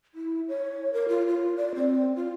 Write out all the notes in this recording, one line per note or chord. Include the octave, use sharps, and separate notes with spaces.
E4
C#5
A#4
F4
F4
D5
C4
F4